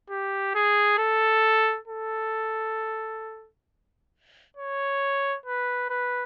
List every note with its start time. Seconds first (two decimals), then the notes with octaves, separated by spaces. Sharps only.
0.10 G4
0.55 G#4
0.99 A4
1.88 A4
4.57 C#5
5.46 B4
5.90 B4